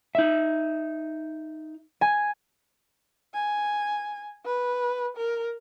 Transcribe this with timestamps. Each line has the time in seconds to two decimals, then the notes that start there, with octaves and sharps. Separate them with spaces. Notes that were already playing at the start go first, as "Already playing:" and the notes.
0.15 D#4 E5
2.01 G#5
3.34 G#5
4.45 B4
5.17 A#4